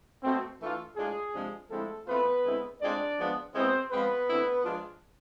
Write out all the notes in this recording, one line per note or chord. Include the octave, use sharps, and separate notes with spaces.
B2 A3 C4
E3 A3 D4 F4
A2 G#3 D4 F4 G#4
C3 F3 G#3 D4
D3 F3 G#3 A3 C4 E4 A4
E3 A3 B3 C4 F4 B4
D3 G#3 C4 E4
A2 G#3 C4 D4 F4 D5
F3 G#3 B3 D4 F4
B2 G#3 B3 C4 E4 C5
F3 G#3 B3 C4 B4
D3 A3 C4 E4
F3 G#3 D4 F4